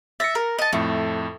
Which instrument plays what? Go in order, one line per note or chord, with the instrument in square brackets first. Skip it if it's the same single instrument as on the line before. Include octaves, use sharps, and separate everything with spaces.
[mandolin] E5 [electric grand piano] A6 A#6 C#7
[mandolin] A#4
D#5 A5
[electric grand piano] F2 A2 [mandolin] A3